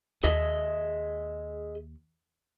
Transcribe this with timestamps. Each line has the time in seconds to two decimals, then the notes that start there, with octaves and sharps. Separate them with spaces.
0.24 D#2 G#4 D#5 E5